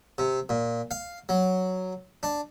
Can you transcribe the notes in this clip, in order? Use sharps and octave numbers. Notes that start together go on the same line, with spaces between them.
C3
A#2
F5
F#3
D4